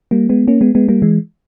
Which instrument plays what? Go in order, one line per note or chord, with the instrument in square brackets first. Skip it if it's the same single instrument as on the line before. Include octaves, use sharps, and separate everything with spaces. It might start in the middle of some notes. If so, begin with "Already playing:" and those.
[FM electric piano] G3 A#3
G#3 B3
A#3 C#4
G#3 B3
G#3 B3
G3 A#3
E3 G#3